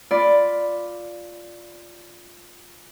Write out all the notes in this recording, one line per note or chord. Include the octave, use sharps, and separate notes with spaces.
F4 D5 B5